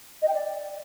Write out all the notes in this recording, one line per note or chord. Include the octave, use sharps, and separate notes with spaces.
D#5
G5
D5